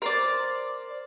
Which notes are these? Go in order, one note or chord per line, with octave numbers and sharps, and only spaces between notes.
A#4 C5 D5